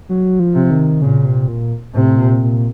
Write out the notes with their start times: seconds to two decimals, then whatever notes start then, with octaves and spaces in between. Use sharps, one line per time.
0.09 F#3
0.40 F3
0.55 C3
0.70 D#3
1.02 A#2 C#3
1.25 C3
1.48 A#2
1.94 A2 C3
2.17 A#2
2.42 A#2